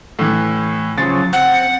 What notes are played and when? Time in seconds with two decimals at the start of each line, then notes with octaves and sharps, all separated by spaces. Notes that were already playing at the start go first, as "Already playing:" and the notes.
0.19 A2 E3
0.98 C#3 F3 F#3 A6
1.33 C4 F#5